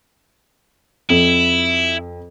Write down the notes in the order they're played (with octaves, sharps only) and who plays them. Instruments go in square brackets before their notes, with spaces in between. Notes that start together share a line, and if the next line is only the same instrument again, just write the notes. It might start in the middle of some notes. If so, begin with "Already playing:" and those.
[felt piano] F2 [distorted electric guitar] E4